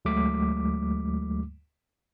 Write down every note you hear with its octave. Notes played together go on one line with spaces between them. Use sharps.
D2 F#3 G#3 A3 D6 B6